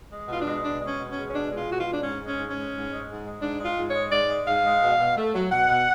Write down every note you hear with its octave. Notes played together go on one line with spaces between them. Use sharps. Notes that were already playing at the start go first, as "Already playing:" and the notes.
G#3
B2 F4
D4
G#3
B2 D4
G#3
C#4
B2
G#3 C#4
C#4
B2 D4
G#3 F4
B2 F#4
F4
G#3
D4
G#2 C#4
G#3
C#4
G#2
C#4
G#3
G#2
G#3
G#2
G#3
G#2 D4
G#3
F4
G#2
C#5
G#3
G#2 D5
G#3
G#2 F5
G#3
B2
B2
A3
F#3
B2 F#5
B2